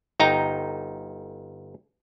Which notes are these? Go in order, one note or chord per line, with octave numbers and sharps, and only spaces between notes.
G1 D#4 G5 A#5